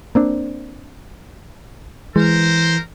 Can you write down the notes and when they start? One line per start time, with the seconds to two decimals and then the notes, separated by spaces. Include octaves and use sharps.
0.15 A#3 C4 D4
2.16 E3 G#3 A#4 C5